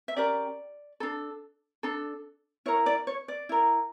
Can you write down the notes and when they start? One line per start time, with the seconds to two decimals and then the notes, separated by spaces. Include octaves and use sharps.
0.08 E5
0.16 C#4 G4 A#4 D5
1.00 D4 A4
1.83 D4 A4
2.66 E4 A#4 C#5
2.86 D5
3.07 C#5
3.28 D5
3.49 E4 A#4